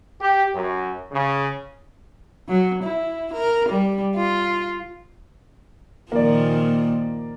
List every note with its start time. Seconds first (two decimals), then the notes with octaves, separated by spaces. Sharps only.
0.21 G4
0.54 F#2
1.12 C#3
2.49 F#3
2.83 E4
3.34 A#4
3.69 G3
4.16 F4
6.12 A#2 D#3 F3 A#3 D5